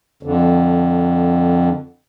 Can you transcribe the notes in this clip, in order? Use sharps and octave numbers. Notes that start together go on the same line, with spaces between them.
F2 D3